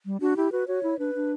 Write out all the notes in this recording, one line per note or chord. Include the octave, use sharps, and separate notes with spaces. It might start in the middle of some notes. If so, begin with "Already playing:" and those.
G3
D4 F#4
E4 G4
F#4 B4
F#4 C#5
E4
D4 B4
D4